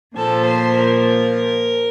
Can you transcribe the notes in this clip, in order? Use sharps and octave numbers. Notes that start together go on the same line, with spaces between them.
A#2 F3 A4
C5
A#4